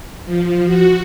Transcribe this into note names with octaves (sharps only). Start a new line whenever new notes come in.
F3
F#4